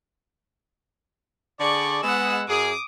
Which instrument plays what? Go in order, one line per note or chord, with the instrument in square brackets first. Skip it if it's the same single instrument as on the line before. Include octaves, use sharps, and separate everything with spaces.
[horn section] D3 G#4 D5 [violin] C#6
[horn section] G#3 B3 [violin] F#5 E6
[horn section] F#2 G#4 [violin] D6 D#6